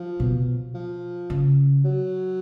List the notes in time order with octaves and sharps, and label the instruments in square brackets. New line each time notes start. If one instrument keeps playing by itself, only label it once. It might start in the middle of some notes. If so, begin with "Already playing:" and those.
Already playing: [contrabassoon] F3
[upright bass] B2
[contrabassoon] F3
[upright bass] C#3
[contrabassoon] F#3